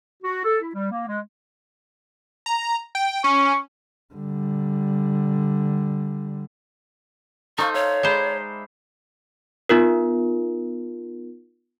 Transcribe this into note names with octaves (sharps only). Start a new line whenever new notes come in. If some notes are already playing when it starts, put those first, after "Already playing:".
F#4
A4
E4
G3
A#3
G#3
A#5
G5
C#4 C#6
D3 G3
D#4 A4 C5 F5 C#6
C#5 E5
G#3 C5 D5 A#5 B5
B3 D#4 F4 A#4